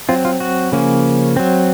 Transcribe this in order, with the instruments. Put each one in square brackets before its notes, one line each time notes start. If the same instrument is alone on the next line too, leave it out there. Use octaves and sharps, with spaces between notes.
[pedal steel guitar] F#3 C4 F4
F4
F#4
C#3 F3 A#3 C#4
F#3 C4